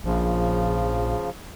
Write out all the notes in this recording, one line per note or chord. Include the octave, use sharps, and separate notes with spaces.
A#1 C#3 F3